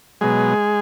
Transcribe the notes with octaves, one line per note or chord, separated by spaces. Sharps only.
B2 F#3 G#3 G#4